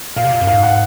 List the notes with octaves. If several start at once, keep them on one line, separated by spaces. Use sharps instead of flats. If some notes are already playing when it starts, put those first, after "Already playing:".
A#2 F5
C3
A#2
F#2
G#2 F5
F#5